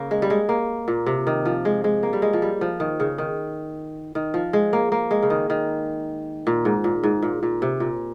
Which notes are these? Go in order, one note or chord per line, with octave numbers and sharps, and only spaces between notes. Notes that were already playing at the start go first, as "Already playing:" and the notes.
Already playing: C#3 A#3
G#3
G3
G#3
A#3
A#2
C3
D#3
F3
G#3
G#3
A#3
G3
G#3
F3
G3
F3
D#3
C#3
D#3
D#3
F3
G#3
A#3
A#3
G#3
C#3
D#3
D#3
A#2
G#2
A#2
G#2
A#2
A#2
C3
A#2